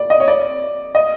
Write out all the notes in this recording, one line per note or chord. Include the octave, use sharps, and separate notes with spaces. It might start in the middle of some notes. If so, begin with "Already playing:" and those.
Already playing: D5
D#5
C#5
D5
D#5